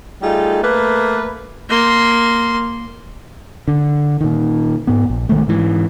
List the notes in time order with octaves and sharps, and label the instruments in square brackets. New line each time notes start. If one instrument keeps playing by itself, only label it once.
[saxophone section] G3 A3 D#4 F4 G#4
A3 A#3 B4
[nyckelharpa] A#3 C6
[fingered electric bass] D3
A#2 D#3
G#2 B3
A#1
B1 D#3 G#3 A3
G#2 E3